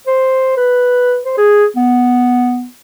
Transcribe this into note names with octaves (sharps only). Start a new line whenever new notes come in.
C5
B4
C5
G#4
B3